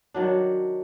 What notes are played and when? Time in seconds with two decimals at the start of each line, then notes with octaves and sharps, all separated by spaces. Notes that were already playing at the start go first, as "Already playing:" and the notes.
0.14 D#3 F#3 D4